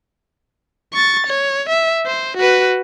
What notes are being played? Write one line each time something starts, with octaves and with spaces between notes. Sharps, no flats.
C#6 A6
C#5
E5
C5
F#4 B4